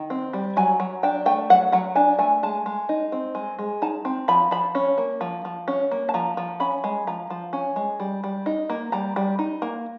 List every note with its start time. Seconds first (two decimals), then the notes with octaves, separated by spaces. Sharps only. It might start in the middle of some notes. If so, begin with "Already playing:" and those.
Already playing: D#3
0.10 C4
0.33 G3
0.57 F#3 G#5
0.80 F#3
1.03 D4 G5
1.26 A3 G5
1.50 F#3 F#5
1.72 F#3 F#5
1.96 D4 G#5
2.19 A3 G#5
2.43 G#3 A5
2.66 G#3
2.89 D#4
3.12 C4
3.35 G#3
3.59 G#3
3.82 D#4 A5
4.05 C4
4.28 F3 B5
4.51 F3 B5
4.75 C#4
4.98 A#3
5.21 F3
5.45 F3
5.68 C#4
5.91 A#3
6.09 A5
6.14 F3 A#5
6.37 F3
6.60 C#4 B5
6.84 G#3
7.07 F3 A#5
7.30 F3
7.53 C#4
7.76 G#3
8.00 G3
8.24 G3
8.46 D#4
8.70 A#3
8.92 G3 A#5
9.16 G3
9.39 D#4
9.62 A#3